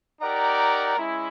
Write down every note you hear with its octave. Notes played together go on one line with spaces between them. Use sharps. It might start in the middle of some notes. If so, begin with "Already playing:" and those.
D#4 G4 A#4 D5 F#5 A#5
G#3 C#4 E4